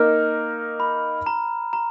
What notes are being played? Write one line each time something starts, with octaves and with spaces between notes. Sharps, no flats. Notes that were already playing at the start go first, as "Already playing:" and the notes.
Already playing: A#3 D#4 A#4 F6
B5
A#5
A#5